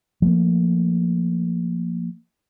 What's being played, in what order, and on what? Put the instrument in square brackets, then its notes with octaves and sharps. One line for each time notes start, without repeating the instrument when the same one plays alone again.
[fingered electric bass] F3 A3 A#3